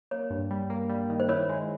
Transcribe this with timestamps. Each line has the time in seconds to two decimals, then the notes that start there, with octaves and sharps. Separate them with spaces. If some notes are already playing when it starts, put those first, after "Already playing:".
0.11 A#3 C#5
0.30 G2
0.51 G3
0.70 A#3
0.89 G3
1.09 D#3
1.20 C5
1.29 E4 C#5
1.49 G#3